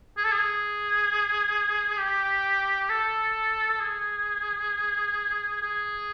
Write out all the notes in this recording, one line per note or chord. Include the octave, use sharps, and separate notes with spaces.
G#4
A4
G#4
G4
A4
G#4
G#4